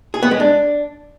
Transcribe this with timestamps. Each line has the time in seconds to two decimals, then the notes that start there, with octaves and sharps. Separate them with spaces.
0.14 G#4
0.23 B3
0.31 G#3
0.40 D4